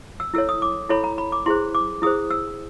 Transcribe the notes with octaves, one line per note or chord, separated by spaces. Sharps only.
E6
E4 A4 C#5 E6
D#6
D6
E4 A4 C#5 B5
A#5
B5
D6
E4 G#4 C5 C6
D6
E4 G#4 C5 D#6
E6